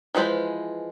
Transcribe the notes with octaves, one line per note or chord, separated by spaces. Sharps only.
E3 F3 G#3 B4 C5